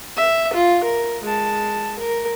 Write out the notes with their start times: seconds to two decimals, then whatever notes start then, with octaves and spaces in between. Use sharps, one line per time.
0.17 E5
0.53 F4
0.84 A#4
1.23 G#3 A5
1.99 A#4